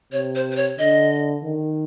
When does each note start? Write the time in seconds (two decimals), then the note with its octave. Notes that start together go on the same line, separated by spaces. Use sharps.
0.12 C3 C#5
0.35 C5
0.51 C5
0.56 C#5
0.79 D3 D#5
1.44 D#3